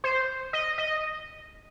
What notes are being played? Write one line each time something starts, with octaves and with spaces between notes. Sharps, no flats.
C5
D#5
D#5